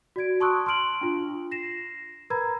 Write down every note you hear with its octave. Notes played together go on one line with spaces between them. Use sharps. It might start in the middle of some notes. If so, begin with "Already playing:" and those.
F#4 D5 G#6 D7
A5 C6 C#6 D#6 E6 F#6
C6 F6 D7 F#7
D4 F4
A#6 C7 E7
A#4 B4 A#5 B5 G#6